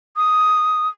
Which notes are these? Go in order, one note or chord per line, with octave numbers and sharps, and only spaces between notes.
D#6